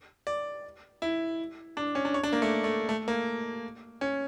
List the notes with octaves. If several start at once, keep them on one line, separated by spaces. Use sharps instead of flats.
D5
E4
D4
C#4
D4
C#5
D4
A#3
A3
A3
A3
A#3
C#4